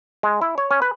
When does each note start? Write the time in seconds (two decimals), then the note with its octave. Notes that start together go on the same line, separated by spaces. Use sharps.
0.23 G#3
0.41 E4
0.58 C#5
0.71 C#4
0.82 B4